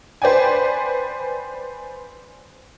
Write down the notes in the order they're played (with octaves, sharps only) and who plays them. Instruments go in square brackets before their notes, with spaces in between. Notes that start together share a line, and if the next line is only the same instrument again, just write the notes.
[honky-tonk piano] B4 C5 D5 G5 G#5